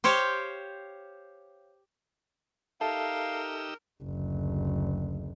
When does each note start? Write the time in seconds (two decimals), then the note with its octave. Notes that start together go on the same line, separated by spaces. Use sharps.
0.04 G4 C5 C#5 F5 G5
2.81 D#4 G4 A4 A#4 E5 F5 A5 E6
4.03 F#1 D2